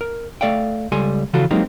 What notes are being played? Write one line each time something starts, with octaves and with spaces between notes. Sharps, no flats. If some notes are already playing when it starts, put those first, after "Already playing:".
A#4
A3 A4 D5 F5 G5
C#2 G3 A4 G#5 C6
C#3 E3 F3 F4 F#4 A4
F#3 G#3 A#3 C4 D#4 G4